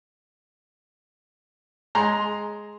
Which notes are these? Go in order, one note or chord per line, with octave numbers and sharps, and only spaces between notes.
G#3 A#5 C6